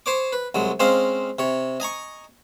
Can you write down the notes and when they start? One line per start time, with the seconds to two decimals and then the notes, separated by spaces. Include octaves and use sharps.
0.06 C5 C#5 D6
0.33 B4
0.55 C2 F#3 G#3
0.80 G#3 C4 C#4 C5 D#5 F5
1.39 C3 C#5
1.80 D#5 G#5 A#5 C#6